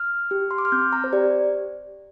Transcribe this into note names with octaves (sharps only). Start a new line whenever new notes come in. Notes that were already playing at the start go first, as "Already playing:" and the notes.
Already playing: F6
G4
C6
D6
F6
C4 G6
A#5
C5
G4 D5